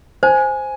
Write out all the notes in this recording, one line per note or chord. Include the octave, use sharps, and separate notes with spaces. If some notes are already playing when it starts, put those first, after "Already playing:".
C5 G#5